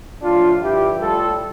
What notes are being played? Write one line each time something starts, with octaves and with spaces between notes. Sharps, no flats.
A2 F3 D4 F4
G2 D3 F3 E4 G4
A2 G3 F4 A4